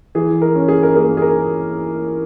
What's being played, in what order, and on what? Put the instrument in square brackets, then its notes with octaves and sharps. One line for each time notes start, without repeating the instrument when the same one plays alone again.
[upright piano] E3 G#4
A#4
C#4
G#4
A#4
A#3 G#4
G#4
A#4